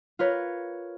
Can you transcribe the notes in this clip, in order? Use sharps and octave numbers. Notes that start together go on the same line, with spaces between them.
F4 A#4 B4 C#5